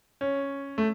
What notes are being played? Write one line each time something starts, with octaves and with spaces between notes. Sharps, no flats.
C#4
A3